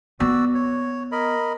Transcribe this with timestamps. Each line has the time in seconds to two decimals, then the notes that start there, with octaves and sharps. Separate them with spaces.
0.20 B3 F#4 D5 E6
0.55 C#5
1.12 A#4 D#5 B5